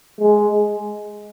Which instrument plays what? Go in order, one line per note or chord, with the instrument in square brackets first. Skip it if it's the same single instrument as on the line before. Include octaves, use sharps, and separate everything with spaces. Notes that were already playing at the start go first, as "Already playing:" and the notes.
[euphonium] G#3